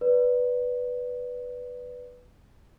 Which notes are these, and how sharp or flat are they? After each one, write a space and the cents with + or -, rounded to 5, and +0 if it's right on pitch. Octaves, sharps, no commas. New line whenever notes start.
B4 +0 D5 +0